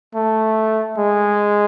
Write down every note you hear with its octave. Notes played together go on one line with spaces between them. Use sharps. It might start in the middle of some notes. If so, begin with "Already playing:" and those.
A3
G#3